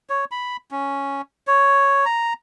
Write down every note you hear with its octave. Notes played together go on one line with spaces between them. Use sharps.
C#5
B5
C#4
C#5
A#5